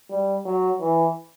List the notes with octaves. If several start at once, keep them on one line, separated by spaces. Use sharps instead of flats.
G3
F#3
E3